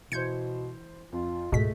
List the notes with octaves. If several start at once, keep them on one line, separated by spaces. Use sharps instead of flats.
B2 E3 C5 G6 G#6 C#7
F2 F4
C#2 G#2 B2 G#3 A3 B6